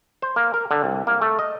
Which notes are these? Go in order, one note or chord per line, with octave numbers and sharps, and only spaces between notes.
C5
A#3
A#4
D3
C2
A#3
A3
D#5